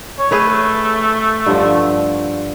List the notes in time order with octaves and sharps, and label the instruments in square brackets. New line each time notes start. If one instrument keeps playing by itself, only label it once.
[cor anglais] C#5
[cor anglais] A3 [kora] G#4 B4 C#5
[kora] G2 D3 F3